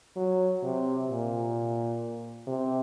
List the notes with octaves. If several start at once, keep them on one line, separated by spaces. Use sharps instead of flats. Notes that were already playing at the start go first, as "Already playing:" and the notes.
F#3
C3
A#2
C3